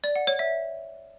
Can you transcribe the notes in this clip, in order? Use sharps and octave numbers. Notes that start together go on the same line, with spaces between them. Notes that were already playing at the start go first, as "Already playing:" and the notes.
D5
F#5
C#5
E5